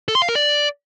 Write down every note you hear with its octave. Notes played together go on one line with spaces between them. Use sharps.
A4
C6
F5
A#4
D5